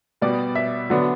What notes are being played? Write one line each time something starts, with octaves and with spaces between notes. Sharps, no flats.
B2 G3 B3 D5
E5
D3 F#3 B3 D4